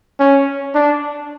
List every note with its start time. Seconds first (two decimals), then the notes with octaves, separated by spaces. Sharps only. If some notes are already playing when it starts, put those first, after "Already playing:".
0.20 C#4
0.75 D4